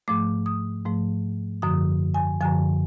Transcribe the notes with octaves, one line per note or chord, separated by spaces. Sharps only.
G#2 F3 A3 D6
D#6
G#2 F3 A3
F#2 D3 F3 D#6
G#5
F#2 D3 F3 G#5